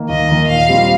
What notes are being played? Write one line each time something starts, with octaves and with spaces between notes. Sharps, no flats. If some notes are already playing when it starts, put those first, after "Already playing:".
Already playing: D#3 A#3
D#2 D#5
D#3 A#3
A#2 F5
G3 C4 F4